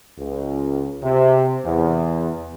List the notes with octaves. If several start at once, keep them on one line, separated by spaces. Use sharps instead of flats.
C#2
C3
E2